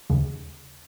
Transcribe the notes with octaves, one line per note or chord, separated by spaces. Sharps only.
D#2 C#3